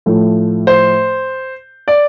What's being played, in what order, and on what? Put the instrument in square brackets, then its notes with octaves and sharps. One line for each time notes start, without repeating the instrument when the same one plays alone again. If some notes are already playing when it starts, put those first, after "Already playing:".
[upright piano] A2 F3 A3
[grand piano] C5
D5